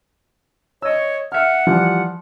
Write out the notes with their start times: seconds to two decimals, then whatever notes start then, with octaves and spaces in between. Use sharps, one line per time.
0.82 C#5 D#5 E6
1.32 E5 F#5 F6
1.67 E3 F3 G3